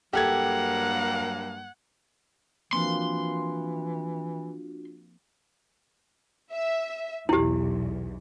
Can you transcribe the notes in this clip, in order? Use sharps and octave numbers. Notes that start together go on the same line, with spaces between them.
G2 F#3 A#3 G4 A4 F#5 G#6
E3 F3 A#3 C4 D4 F4 F#4 C6
E5
B1 E2 E4 G4